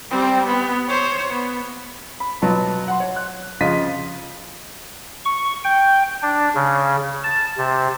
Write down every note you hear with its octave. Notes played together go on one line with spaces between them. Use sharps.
G3 C4
B3
C5 C#5
B3
B5
B2 F#3 B3 F4 A5
F#5 C6
C#5
F#6
C#3 F3 F4 D#5 B6 D#7
C#6
G5
D4
C#3
A5
C3